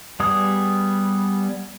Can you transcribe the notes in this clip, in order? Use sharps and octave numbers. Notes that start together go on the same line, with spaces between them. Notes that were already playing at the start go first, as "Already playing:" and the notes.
G3 B3 G#4 D#6